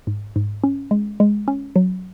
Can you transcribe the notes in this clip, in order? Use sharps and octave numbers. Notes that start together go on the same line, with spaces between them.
G#2
G#2
C#4
G#3
G#3
C#4
F#3